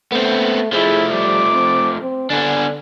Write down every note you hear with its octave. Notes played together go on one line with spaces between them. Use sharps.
A3 B3 C4
F3 A3 E4 G#4
G3 D6
C4
C4
D3 B3 D4 G#5